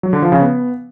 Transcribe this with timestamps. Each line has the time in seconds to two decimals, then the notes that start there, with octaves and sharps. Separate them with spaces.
0.03 F#3
0.13 D3
0.22 F3
0.32 C#3
0.41 B3